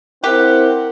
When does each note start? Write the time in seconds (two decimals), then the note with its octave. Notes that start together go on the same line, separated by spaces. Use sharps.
0.24 C4 E4 G4 A#4 F#5